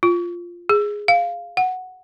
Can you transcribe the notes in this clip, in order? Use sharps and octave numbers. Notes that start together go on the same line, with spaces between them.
F4
G#4
F5
F#5